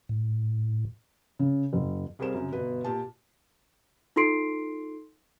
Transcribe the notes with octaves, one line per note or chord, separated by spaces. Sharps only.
A2
C#3
F#1
C2 G3 G#4 A#4 C5 E7
F#2 C#3
G1 B2 B4
A#2 G4 A5
D#4 F4 A4 C6 C7 D7